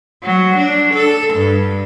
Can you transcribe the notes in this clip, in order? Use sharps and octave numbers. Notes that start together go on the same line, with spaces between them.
F#3
D4
A4
G2